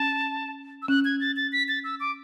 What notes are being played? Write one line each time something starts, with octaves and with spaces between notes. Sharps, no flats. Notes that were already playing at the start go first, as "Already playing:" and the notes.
Already playing: C#4 A5
E6
C#4 F#6
G#6
A6
A6
B6
A6
E6
D6